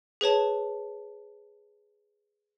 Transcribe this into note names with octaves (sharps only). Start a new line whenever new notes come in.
G#4 B4 C#5 A5